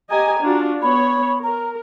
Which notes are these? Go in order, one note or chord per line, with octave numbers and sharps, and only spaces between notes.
G4 D#5 G#5 A#5
D4 F4 F#4
B3 C#5 B5
A#4 A#5